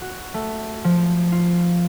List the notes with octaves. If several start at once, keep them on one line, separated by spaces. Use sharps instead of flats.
F#4
A3
F3
F4